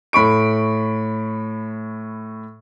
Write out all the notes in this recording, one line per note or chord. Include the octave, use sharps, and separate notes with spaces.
A2 B5 C#6 D7